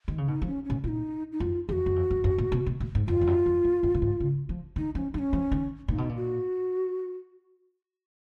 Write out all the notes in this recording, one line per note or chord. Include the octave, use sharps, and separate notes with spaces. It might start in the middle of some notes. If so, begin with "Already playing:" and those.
D#3
C#3
B2 D#4
F3
C#4
A#2 C#4
A#2 D#4 F4
D#4
F#2 F4
F2 G#4
F#4
F#2
F2
F#2
F#2
A#2
B2
B2
A#2
G#2
F#2 F4
F2
F#2
F2
F#2
F#2
A#2
G#2
C#3
F3
D#3 D#4
F3 C#4
F#3 D#4
C#4
F3
D#3
A#2 D#4
B2
A#2
F#4